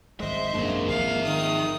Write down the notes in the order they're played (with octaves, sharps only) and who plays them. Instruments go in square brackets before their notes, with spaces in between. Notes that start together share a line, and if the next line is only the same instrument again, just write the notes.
[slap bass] G#1 G#3 [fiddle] C5 D#5 [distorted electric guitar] E5
[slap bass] G#1 F#2 G#3 [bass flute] A#3 [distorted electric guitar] D4 G#4
[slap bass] G#1 F3 [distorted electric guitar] G#4 E5 [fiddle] F5
[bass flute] D#3 [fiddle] D#6